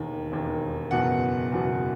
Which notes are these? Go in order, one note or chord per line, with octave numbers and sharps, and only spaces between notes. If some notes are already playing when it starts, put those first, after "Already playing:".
Already playing: E1 D#2 D#3
E1 D#2 D#3
F#1 E2 B2 F#3 F#5
F#1 E2 B2 F#3